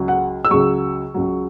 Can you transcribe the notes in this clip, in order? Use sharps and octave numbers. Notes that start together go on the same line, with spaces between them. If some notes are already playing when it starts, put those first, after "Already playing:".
Already playing: C#2 C#3 F#3
F#5
E6
C#2 C#3 F#3 C#6
C#2 C#3 F#3